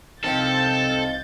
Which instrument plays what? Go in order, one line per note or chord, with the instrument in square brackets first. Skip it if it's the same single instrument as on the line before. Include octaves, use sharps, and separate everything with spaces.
[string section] C2 G6 A6 [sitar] D#3 F3 [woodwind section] C4 [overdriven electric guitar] A4